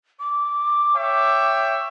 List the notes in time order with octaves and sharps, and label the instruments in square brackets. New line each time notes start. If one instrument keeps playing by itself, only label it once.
[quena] D6
[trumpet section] C#5 E5 G5